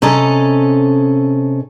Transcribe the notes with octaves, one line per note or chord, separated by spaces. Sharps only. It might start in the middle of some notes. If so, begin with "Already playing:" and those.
C3 C#4 A4 D#5 A#5